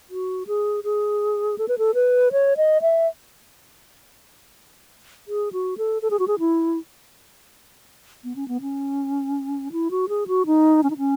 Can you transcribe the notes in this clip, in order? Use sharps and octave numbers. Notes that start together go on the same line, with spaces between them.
F#4
G#4
G#4
A4
B4
A4
B4
C#5
D#5
E5
G#4
F#4
A4
A4
G#4
F#4
G#4
E4
B3
C#4
B3
C#4
E4
F#4
G#4
F#4
D#4
C#4
D#4
C#4